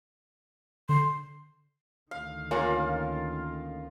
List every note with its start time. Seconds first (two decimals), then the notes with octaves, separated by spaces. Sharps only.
0.89 D3 C6
2.11 D2 D#3 F5
2.51 A#3 C#4 F4 A#4 F#5